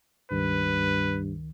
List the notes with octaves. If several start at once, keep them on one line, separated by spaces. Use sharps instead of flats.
C#2 G2 D#3 B4